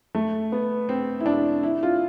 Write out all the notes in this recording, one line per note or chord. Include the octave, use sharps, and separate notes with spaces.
A3
B3
C4
E4
D4
E4
F4